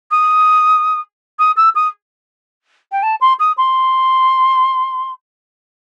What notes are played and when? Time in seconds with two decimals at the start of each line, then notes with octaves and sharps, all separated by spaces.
0.11 D#6
1.39 D#6
1.57 E6
1.75 D#6
2.92 G5
3.03 A5
3.21 C6
3.40 D#6
3.58 C6